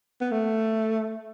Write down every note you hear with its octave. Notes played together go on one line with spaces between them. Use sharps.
B3
A3